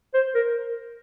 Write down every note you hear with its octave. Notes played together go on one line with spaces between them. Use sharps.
C5
A#4